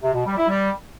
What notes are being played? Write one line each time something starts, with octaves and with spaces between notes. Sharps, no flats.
C3
B2
G3
E4
G3